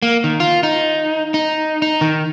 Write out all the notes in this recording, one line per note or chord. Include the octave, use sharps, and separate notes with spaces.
A#3
D#3
F4
D#4
D#4
D#4
D#3